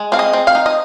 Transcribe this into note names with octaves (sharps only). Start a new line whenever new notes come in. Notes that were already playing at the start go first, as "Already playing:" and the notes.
Already playing: G#3
C4 F5
D#5
C4
F5
D#4
D#5